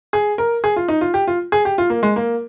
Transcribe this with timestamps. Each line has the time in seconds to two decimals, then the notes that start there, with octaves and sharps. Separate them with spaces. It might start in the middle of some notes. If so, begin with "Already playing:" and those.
0.13 G#4
0.38 A#4
0.64 G#4
0.76 F4
0.88 D#4
1.01 F4
1.14 G4
1.27 F4
1.52 G#4
1.65 G4
1.78 F4
1.90 A#3
2.03 G#3
2.16 A#3